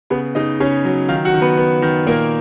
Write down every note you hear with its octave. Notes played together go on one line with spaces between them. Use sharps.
C#3 B3 B4
C#3 D#4 D#5
C#3 C#4 C#5
F#3
D#3 F4 F5
F#4 F#5
D#3
B3 B4
B3
D#3
A#2 A#3 A#4